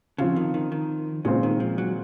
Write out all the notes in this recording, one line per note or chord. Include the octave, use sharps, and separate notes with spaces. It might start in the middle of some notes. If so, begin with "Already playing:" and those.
C#3 F3 C4 F4
D#3
D#3
D#3
A#2 C#3 G#3 C4 F4 C5
D#3
F3
F#3